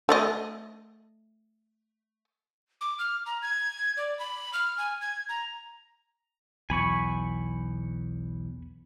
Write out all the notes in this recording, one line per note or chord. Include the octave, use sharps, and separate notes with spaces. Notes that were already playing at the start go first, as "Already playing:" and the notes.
A3 D5 D#5
D6
F6
A#5
G#6
D5
B5
F6
G#5
G#6
A#5
B1 E2 G#5 B5 C#6